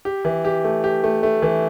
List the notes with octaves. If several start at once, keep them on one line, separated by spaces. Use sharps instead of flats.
G4
E3
G4
A3
G4
A3
A3
E3